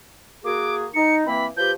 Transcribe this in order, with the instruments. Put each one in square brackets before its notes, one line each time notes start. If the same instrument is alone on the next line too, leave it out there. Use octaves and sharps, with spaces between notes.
[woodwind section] A#3 F#4 G#4 [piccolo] D6
[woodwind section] D#4 [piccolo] C#7
[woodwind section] E3 A#3 C4 [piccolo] B5
[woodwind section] F3 G4 B4 [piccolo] G6